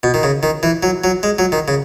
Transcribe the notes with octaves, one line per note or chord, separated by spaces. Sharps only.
B2
D#3
C#3
D#3
E3
F#3
F#3
G#3
F#3
D#3
C#3